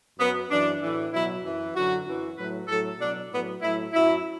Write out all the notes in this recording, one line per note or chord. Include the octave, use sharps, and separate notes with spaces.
F#2 F#3 B3
F#2 E3 D4
A2 E3
B2 F#3 E4
F#2 E3
F#2 D3 F#3 F#4
F#2 E3
A2 F#3 B4
A2 F#3 A4
B2 F#3 D4
A2 F#3 B3
A2 F#3 E4
F#2 F#3 E4